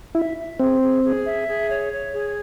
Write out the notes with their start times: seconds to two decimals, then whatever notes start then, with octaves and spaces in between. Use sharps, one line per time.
0.15 E4 E5
0.38 E5
0.60 C4 G#4
0.81 G#4
1.04 G#4
1.26 E5
1.48 G#4
1.70 C#5
1.92 C#5
2.14 G#4